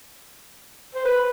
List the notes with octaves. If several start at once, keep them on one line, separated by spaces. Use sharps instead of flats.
C5
B4